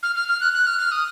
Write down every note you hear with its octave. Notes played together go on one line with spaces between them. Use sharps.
F6
F6
F6
F#6
F#6
F6
F6
D#6